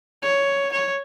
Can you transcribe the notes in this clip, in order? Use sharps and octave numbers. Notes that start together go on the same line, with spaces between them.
C#5
C#5